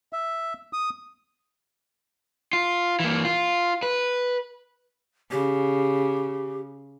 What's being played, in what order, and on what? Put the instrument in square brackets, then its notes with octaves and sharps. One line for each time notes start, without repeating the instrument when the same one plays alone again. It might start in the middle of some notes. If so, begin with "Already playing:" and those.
[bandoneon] E5
D#6
[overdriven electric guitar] F4
E3 A#3
F4
B4
[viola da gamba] C#3 [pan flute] G4